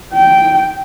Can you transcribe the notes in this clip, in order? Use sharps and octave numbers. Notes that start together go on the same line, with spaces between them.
G5